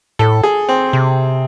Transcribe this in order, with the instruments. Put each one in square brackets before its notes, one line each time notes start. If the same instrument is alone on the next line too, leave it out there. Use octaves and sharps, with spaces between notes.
[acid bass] A2 [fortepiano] A4
[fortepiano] G#4
C4
[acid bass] C3